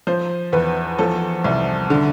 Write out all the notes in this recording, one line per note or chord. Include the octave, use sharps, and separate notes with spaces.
F3 C5
E2 B4
F3 A4
C2
D3